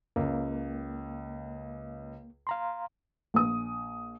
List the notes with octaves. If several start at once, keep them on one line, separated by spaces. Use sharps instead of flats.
C#2 C#3 A#3
F5 A#5 C6
A#1 D#6